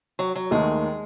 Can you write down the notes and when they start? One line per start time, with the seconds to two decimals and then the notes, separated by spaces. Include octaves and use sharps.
0.19 F#3
0.36 F#3
0.51 D#2 D#3 G#3 A3